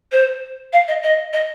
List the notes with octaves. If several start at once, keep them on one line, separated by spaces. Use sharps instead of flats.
C5
F5
D#5
D#5
D#5